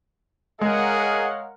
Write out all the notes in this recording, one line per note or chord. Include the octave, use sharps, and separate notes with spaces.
G#3 G#4 A#4 C#5 D#5 F5 F#5